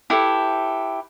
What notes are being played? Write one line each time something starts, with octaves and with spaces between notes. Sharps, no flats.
E4 G4 A4 B4